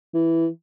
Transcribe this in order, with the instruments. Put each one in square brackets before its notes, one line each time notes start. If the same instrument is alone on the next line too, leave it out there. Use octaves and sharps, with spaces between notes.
[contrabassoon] E3